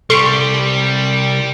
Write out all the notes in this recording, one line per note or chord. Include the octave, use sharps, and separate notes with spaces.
C2 G3 A4 C6 C#6